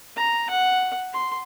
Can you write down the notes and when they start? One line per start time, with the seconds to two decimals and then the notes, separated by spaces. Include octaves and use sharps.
0.16 A#5
0.49 F#5
1.13 C6